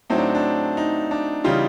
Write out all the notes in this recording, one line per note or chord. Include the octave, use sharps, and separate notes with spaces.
A2 F#3 A3 C4 D#4
D4
D4
D#4
D4
C#3 E3 G3 D#4 F4